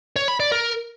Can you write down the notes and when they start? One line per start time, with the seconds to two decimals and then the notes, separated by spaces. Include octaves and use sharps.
0.16 C#5
0.28 B5
0.40 D5
0.52 A#4